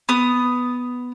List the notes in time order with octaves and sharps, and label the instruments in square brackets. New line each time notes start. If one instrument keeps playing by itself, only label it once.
[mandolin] B3 D#6